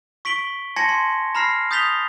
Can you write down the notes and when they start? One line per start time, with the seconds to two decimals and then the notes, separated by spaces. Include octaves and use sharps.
0.25 C#6 B6 D7 F#7 G7
0.76 G#5 A5 C6 G#6 A#6 C#7
0.89 C6
1.35 A#5 B5 F6 A#6 C7
1.71 D#6 G6 A6 B6 F7 G7